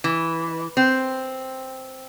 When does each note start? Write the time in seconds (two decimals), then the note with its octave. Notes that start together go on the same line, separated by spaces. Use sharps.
0.04 E3
0.77 C4